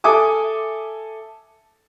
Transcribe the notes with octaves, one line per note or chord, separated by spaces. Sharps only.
A4 E5 G#5 D6 D#6